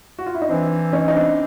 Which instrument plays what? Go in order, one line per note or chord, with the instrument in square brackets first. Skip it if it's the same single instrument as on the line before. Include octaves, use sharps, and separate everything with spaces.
[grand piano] F#4
F4
E4
D#4
[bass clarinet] E3 [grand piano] C4 D4
[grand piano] C#4 D#4
D#4
C4 D4